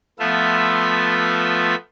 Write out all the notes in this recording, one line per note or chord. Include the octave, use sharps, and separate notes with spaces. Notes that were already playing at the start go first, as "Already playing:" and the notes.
F3 A3 B3 F4 E5